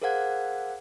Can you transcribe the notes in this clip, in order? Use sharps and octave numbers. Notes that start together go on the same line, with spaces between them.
G#4 A#4 C5 F5 F#5 G#6